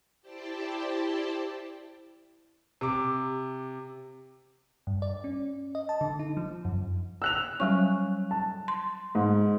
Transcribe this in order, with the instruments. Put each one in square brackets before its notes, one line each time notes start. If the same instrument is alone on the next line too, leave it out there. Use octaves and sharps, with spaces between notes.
[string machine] E4 G4 C5 D5 G5 A5
[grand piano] C3 D6
[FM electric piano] G2
D5
C#4
D#5
A5
D3
D#4
F3
F#2
[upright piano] E6 F#6 F7
[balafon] F#3 G3 C#6 [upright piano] C#4
[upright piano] A5
[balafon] C6
[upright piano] G#2